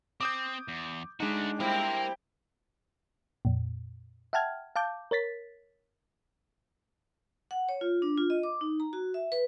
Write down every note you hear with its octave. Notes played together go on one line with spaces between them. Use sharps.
C4 D6 D#6 G6
E2
G#3 A3 D4 D#4 F#4
G3 A#3 C4 E4 A#4 G5
F2 A#2
E5 F#5 G5 A5 F6 G#6
F5 A5 D6 G6
A#4 C#5 A6 B6
F#5
C#5
F4
D4
F4
D#5
D6
D#4
A#5
F#4
E5
B4